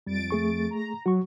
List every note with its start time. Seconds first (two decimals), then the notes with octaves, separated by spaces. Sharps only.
0.07 F2 G3 A6 D7
0.31 A3 G#4 C#6
0.71 A#5
1.06 F#3 F#4 C#6